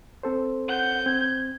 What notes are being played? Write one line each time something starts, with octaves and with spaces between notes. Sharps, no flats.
C4 A4 C5
F#5 G6
C4 G#6